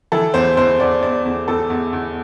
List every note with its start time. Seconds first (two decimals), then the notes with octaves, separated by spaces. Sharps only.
0.12 E3 A4
0.34 E2 C5
0.57 E2 C5
0.79 E2 D5
1.02 E2 D5
1.26 E2
1.48 E2 A4
1.70 E2
1.93 E2